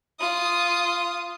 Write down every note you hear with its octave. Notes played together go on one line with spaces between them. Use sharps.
F4 D#6